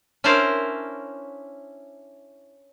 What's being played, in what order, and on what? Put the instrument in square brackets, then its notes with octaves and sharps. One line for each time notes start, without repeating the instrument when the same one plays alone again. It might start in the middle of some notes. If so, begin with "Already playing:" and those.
[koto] C#4 D4 E4 A#4 C5 D5